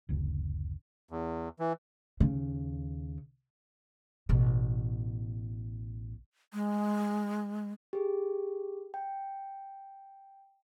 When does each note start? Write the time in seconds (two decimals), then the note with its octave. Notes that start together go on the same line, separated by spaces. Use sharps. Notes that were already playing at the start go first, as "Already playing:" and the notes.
0.09 F#1 D2 C#3
1.11 E2
1.59 E3
2.20 D#2 C#3
4.29 A1 B2
6.53 G#3
7.93 G4 G#4
8.94 G5